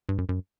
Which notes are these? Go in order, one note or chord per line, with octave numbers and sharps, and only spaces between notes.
G2
F#2
F#2